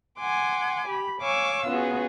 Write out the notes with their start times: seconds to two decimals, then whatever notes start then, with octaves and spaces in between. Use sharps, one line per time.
0.20 F#5 G#5 C6 D6
0.87 G4 B5
1.20 C#5 F5 G#5 C#6 D6 E6
1.67 B3 C#4 F4 F#4 G#4